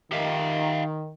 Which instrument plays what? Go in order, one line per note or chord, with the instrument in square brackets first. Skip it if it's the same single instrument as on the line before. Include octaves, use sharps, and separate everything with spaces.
[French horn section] D#3 [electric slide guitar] G4 E5 F5